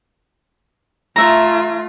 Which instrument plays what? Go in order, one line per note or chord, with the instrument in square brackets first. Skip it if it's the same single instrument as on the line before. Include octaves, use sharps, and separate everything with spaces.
[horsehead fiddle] A3 F4 [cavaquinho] E5 A#5